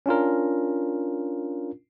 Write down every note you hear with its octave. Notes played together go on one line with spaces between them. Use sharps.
C#4 D4 F4 A#4